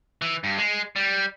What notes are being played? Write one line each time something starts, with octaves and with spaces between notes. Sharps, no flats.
E3
G2
G#3
G3